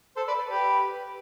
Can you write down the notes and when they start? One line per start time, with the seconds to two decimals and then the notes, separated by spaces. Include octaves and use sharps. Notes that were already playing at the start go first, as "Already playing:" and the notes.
0.16 A4 C5
0.28 B4 D5
0.50 G4 B4